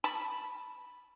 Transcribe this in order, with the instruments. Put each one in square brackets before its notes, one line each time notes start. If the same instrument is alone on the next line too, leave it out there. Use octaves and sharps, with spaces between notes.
[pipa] A5 B5